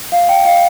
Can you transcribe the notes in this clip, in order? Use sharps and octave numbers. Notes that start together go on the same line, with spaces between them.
F5
G5
F5